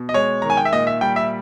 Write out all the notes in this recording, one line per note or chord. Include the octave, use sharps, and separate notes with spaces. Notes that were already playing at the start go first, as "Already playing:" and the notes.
Already playing: B2
D#5
G#3 C#5
D#3 A#5
G#5
G5
E5
A#2 D#5
E5
G3 G5
E5